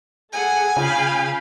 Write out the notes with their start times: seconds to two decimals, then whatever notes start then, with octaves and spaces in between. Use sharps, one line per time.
0.33 G#4 A4 F#5 G#5
0.77 C#3 F4 F5 G5 B5